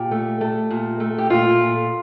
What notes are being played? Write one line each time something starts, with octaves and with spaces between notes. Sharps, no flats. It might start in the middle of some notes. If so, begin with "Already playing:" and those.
Already playing: A#2 G4
A3
A3
A#2
A3
G4
A#2 F4
A#2